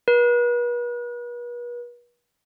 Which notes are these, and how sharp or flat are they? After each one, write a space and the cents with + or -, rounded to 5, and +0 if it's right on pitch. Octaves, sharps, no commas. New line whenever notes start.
B4 -40